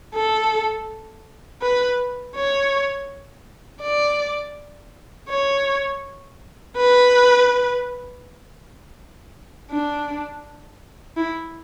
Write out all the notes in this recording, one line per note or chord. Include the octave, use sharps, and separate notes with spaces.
A4
B4
C#5
D5
C#5
B4
D4
E4